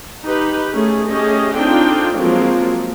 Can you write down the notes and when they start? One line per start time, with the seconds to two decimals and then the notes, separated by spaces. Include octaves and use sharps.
0.23 D#4 G4 B4
0.72 A3 C#4 G#4
1.09 A3 C#4 G4 G#4 D#5
1.56 C4 D4 D#4 F4 A4 G5
2.16 F3 F#3 G#3 A#3 C4 F4